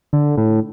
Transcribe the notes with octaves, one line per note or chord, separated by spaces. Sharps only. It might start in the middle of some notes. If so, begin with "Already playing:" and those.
D3
A2